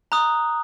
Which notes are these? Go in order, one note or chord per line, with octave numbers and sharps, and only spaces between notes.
A#5 D#6 F#6